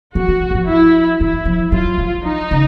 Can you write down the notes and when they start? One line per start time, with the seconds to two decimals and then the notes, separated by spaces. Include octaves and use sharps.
0.15 F3 F#4
0.28 E3
0.50 F#3
0.54 F3
0.68 E4
1.20 E3 E4
1.45 F3
1.72 F#3 F4
1.98 F3
2.24 D#4
2.51 C#3